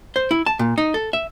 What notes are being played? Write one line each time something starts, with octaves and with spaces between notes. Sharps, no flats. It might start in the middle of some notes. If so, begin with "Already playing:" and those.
C5
E4
A5
A#2
D#4
A4
E5